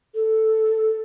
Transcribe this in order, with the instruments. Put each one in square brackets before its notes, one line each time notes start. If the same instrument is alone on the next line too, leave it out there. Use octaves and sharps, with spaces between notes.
[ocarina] A4